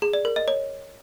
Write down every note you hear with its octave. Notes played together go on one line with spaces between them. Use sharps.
G#4
D5
A#4
D#5
C#5